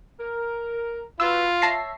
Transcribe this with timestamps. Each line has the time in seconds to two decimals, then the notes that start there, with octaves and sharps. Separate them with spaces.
0.19 A#4
1.20 F4 F#4 B4 E6
1.62 C#5 E5 A5 A#6 C7